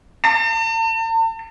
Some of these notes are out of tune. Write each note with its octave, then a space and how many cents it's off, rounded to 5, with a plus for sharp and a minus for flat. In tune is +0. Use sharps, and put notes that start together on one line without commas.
A5 +45